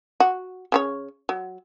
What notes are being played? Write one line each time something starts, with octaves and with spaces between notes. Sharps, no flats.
F#4
C#3 C4 C#5
F#3